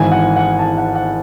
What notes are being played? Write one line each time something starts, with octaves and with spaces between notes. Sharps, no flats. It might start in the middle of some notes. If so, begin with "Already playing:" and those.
Already playing: G#1 G#2 E3 G#5
F#5
F#5
A5
F#5
F#5